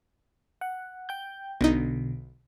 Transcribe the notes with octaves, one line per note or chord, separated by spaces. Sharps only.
F#5
G5 G6
B1 B2 D3 D#4